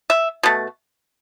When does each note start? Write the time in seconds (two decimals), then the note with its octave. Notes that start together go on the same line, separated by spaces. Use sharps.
0.10 E5
0.43 B2 A3